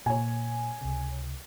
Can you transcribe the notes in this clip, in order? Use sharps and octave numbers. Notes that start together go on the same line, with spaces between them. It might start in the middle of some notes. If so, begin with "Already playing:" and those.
A#2 C#5 G#5
C#2 C3